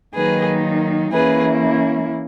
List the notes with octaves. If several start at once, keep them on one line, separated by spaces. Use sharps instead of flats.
D#3 F#3 A#3 D#4 G#4 B4
E3 A#3 C#4 E4 G#4 B4